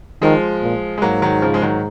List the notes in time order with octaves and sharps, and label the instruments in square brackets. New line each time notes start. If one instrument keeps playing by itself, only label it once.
[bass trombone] D#3 [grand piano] F3 G#3
[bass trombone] A#2
[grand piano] G#3
[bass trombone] G#2 [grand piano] F#3 A#3
[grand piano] D#3 F#3
C#3 F3
G#3
D#3 F#3